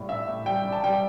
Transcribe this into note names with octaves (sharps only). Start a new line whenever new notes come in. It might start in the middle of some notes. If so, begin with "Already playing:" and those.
Already playing: A2 G3
D4 E5
A2
G3 G5
D4
A5
G3 G5